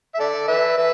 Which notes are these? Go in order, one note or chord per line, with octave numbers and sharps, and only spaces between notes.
E5
A4 D5
B4 E5
B4 E5